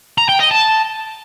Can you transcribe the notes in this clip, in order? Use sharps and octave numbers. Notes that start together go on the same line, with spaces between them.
A#5
G5
D#5
A5